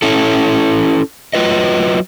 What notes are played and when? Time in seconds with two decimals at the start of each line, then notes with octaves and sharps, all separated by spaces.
0.02 C#4 E4 A4
1.33 F#3 F4 B4 D#5